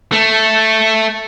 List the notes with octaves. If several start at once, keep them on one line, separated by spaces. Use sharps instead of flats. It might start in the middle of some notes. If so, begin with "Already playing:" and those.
A3